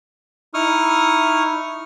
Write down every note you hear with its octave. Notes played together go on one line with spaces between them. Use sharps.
D#4 E4 C#6 D#6 F6